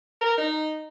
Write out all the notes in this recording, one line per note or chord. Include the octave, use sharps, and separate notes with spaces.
A#4
D#4